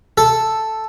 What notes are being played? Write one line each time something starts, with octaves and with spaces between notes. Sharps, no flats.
A4